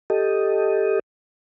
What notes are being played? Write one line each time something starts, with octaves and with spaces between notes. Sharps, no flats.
G4 A4 D#5